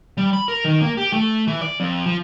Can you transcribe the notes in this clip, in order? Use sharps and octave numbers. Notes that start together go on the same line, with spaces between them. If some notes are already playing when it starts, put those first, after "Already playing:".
G3
B5
A#4
D#3
A#3
G4
A3
E3
D5
F2
F3